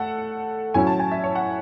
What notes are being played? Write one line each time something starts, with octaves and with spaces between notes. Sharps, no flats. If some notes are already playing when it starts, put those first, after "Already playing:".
Already playing: A3 A4 F#5
A2 F#3 C#4 E4 G#5
A5
G#5
E5
C#5
F#5